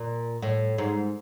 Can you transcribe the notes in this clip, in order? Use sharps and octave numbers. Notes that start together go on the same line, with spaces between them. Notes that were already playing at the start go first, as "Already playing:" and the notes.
Already playing: A#2
A2
G#2